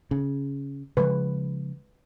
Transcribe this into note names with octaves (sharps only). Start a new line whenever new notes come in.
C#3
C#3 F3 G#3 B4